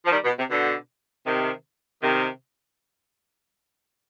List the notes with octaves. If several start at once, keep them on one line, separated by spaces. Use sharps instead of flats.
F3
D#3 G3
B2
C3
B2 D3
C3 D#3
C3 D#3